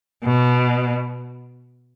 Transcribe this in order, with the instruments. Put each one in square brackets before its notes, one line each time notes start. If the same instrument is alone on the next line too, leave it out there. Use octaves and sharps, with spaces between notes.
[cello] B2